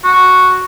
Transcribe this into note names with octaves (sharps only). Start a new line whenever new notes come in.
F#4